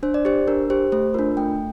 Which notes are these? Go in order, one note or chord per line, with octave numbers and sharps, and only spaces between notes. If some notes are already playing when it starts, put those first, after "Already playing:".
D4 C5
D5
G4 C5
D4 A#4
G4 C5
A3 C5
D4 F4 A#4
A3 G5